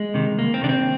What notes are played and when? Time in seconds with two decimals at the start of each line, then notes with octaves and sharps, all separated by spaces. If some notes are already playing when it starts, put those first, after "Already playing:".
Already playing: G#3
0.14 C3 D#3
0.38 C2 A#3
0.54 C4
0.62 C3 D#3 D4
0.69 C4